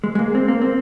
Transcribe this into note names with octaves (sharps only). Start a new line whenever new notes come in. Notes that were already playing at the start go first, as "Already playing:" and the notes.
G#3
G#3
A#3
C4
A#3
C4